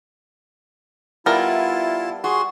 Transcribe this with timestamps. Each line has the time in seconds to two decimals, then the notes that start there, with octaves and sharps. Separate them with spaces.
1.26 G3 B3 E4 F4 A#4 A5
2.24 F#4 G#4 C6